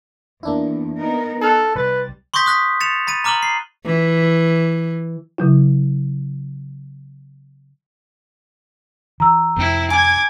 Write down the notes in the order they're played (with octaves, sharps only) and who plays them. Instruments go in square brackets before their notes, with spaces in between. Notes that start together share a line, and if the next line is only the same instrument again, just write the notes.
[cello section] E2 [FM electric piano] A#3 D4 E4
[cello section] B3 D#4 A#4
[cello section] D#4 [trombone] A4 [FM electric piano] A5 F6 F#6
[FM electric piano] C2 A6 [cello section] G3 [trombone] B4
[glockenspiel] C6 C#6 D#6 G6 A#6 B6
D#6 F#6 A#6 B6
A6 C#7 E7 F7
B5 A6 D#7
A#5 D6 F6 D#7 F#7 G7
C7
[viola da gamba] E3
[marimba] C#3 F#3 E4
[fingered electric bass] E3 [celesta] A#5 E6
[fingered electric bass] C2 F2 [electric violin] C4 E4
[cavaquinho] G#5 [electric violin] D6 G#6